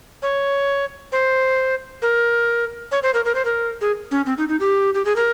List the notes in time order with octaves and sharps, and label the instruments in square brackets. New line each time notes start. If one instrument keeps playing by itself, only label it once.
[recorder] C#5
C5
A#4
C#5
C5
A#4
A#4
C5
A#4
G#4
C#4
C4
D#4
D#4
G4
G4
G#4
A#4